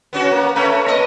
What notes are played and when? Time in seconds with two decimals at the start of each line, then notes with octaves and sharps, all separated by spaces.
0.13 B3 C#4 F#4
0.32 A#3
0.56 A3 C#4 B4
0.86 A#3 D#5